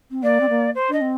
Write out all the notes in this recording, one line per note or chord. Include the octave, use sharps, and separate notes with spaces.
C4
A#3 D5
C4
A#3
C5
D4 D#5
C4